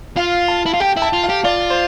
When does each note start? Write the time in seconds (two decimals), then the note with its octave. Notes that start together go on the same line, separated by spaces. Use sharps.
0.17 F4 F5
0.48 A5
0.66 E4
0.74 F4
0.80 G4 G5
0.97 E4
1.02 A5
1.13 F4
1.24 F5
1.29 G4
1.44 F4 D5
1.70 C5